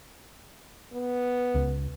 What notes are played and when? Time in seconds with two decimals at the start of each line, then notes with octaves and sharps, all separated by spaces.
0.93 B3
1.55 C#2